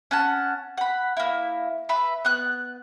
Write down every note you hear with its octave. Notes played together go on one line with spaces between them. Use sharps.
C#4 F#5 A5
F#5 B5
A#3 E4
B4 E5 B5
B3 F#6